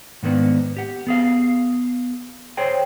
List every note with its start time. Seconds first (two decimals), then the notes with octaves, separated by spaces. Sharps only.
0.23 G#2 D#3 A#3 B3 D4
0.77 G4 F#5
1.07 B3 G#4 F5
2.57 G#4 C5 C#5 G5